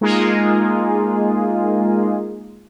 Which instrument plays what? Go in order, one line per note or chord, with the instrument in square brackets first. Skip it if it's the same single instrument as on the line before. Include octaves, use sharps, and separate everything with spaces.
[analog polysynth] G#3 A#3 D#4 F4 G#4